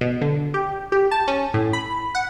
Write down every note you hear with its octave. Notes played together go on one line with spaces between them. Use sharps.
B2
D3
G4
G4
A5
C#4
A2
B5
F#5